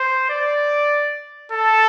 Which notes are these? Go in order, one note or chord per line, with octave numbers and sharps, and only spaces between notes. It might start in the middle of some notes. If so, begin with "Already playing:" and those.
Already playing: C5
D5
A4